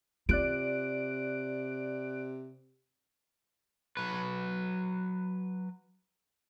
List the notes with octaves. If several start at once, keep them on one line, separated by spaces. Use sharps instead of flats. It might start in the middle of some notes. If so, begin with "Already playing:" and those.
C3 F4 D5 F#6 D7
F#3 B4